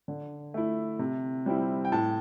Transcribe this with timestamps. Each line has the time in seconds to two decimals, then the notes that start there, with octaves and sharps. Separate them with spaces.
0.08 D3
0.54 A3 E4
0.99 C3
1.46 G3 C4 E4
1.85 G5
1.92 A2 A5